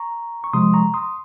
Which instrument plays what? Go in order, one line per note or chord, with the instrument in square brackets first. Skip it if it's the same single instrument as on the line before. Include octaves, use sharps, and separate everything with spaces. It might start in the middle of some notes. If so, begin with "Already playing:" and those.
Already playing: [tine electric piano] A#5 C#6
C#6
C3 F3 G#3 C6 D#6
A#5 C#6
C6 D#6